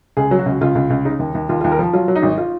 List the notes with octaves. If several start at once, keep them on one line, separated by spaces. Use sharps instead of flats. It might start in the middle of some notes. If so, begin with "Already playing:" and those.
C#2 G#4
F#3
F#4
C#2
C#2 F4
C#2
C#2
C#3 D#4
D#2
D#2
D#2 F4
F4
D#2
A#4
F3
F#3 F4
F#3
D#4
G#1
F4